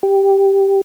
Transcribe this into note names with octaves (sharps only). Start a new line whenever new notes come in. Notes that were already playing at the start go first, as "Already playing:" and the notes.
G4